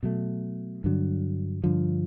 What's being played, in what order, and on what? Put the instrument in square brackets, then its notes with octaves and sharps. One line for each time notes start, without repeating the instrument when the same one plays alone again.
[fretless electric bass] B2 F#3 A3
G2 D3 F#3
G2 D3 F3